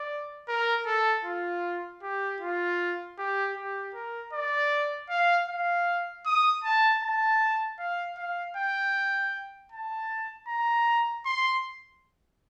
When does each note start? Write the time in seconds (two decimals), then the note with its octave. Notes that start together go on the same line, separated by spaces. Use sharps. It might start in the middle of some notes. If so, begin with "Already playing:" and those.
Already playing: D5
0.48 A#4
0.86 A4
1.25 F4
2.03 G4
2.40 F4
3.18 G4
3.56 G4
3.95 A#4
4.33 D5
5.10 F5
5.48 F5
6.26 D#6
6.64 A5
7.03 A5
7.79 F5
8.17 F5
8.57 G5
9.72 A5
10.48 A#5
11.25 C6